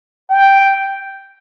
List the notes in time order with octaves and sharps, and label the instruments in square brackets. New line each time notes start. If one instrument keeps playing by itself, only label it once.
[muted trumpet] G5